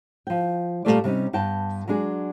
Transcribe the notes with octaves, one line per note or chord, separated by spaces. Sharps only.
F3 G5
A#2 C#3 G3 A3 F4 D5
C3 G3 C#4 D#4
G2 B3 G5 A5
F#3 G#3 D4 G#4